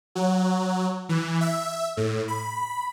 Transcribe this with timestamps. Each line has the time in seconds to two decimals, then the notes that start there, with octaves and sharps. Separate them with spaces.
0.15 F#3
1.09 E3
1.41 E5
1.97 A2
2.28 B5